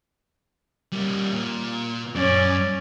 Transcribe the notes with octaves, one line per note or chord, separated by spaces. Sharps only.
G3 A#3
A#2
F#2 C#4 D5